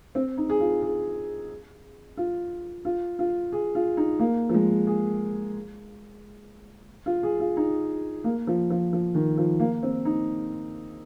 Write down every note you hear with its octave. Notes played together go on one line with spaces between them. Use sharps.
C4
D#4
G#4
F4
G#4
F4
F4
F4
G#4
F4
D#4
A#3
F3
G#3
G#4
F4
G#4
F4
D#4
A#3
F3
F3
F3
D#3
F3
A#3
C4
D#4